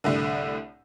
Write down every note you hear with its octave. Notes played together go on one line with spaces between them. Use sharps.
C2 A2 D3